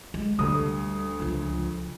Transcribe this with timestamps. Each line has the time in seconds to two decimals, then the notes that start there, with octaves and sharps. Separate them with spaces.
0.14 G#3
0.39 D2 G3 D#6
1.20 C#2 F3